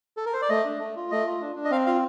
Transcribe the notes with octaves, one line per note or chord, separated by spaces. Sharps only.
A4
A#4
C5
D5
A3 D#5
D4
A3
F4
A3 D#5
F4
D4
D4
D#5
C4 F5
F4 F5